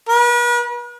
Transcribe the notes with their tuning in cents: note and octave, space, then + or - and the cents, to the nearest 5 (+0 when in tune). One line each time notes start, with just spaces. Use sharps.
B4 -45